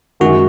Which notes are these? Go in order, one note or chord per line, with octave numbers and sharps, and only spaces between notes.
F#2 D#3 G#3 F#4